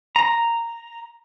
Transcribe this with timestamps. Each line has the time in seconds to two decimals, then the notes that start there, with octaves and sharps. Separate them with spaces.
0.16 A#5